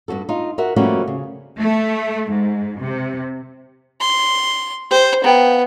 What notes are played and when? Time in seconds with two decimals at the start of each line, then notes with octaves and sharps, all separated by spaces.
0.08 G2 B2 F#4 A4
0.29 D#4 F4
0.58 F#4 A#4 E5 F#5
0.76 F3 G3 A3 A#3 C#4 F#4
1.07 C#3
1.57 A3
2.29 G#2
2.79 C3
4.01 C6
4.91 G4 C5
5.24 B3 F5 G5 A#5